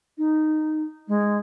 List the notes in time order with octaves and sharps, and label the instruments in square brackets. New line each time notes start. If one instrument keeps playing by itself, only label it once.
[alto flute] D#4
G#3